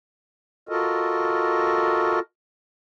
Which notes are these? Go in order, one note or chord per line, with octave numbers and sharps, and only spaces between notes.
F4 F#4 A4 A#4 D#5